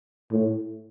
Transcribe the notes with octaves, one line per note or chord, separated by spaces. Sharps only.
A2